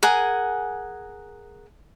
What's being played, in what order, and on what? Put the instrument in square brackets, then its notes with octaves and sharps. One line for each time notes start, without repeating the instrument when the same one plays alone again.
[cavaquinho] G#4 A#4 F#5 G#5